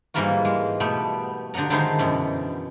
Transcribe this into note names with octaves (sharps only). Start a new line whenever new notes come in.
G#2 E3 G3 A#3 F4 F#4
G#3
B2 A3 B3 G4
D3 G4 D#5 F#5 A#5
D3 D#3 G#3 D#4 E4 C5
F#2 B2 E3